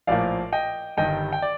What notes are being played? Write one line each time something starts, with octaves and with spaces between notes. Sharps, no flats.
A#1 A2 F3 A#3 D5 F5
D#5 G5
G1 G2 D#3 G3 D#5 G5
G5
D5